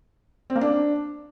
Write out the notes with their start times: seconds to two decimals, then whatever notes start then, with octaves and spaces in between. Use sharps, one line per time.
0.50 C4
0.56 A#3
0.61 D4